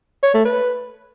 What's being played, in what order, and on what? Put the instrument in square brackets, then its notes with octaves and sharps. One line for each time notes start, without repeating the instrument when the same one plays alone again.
[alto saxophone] C#5
A3
B4